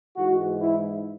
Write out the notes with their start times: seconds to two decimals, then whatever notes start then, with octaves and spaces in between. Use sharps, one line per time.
0.17 G#2 E3 G#3 F#4
0.61 E4